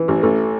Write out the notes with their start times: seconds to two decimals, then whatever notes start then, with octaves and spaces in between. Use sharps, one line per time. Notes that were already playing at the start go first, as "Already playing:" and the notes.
Already playing: E3
0.08 A1
0.23 A1 A3